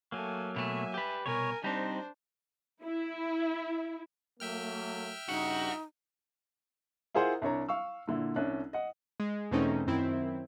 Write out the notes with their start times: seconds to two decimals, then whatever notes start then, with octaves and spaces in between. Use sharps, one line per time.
0.12 F#3 A3 A#3 G#5
0.56 B2 A3 E5 G#5
0.94 G4 B4
1.26 C2 B2 A#4 C#5 G#5
1.64 G3 C4 D4 D#4 C5
2.83 E4
4.40 F#3 A3 A#3 E5 G5 F6
5.28 G2 C#3 D#4 F#4
7.15 E4 F4 G#4 A#4 C5 F#5
7.42 C2 D4 C#5 A#5
7.69 F5 C#6 E6
8.08 A#2 D3 E4
8.36 C2 C#4 D4 F#6
8.73 D#5 F#5
9.20 G#3
9.51 E2 B2 A3 C4 C#4 D#4
9.87 F#2 D#3 C4 E4